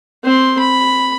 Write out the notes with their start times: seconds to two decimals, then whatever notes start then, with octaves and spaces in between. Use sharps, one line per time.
0.24 C4 C6
0.59 B5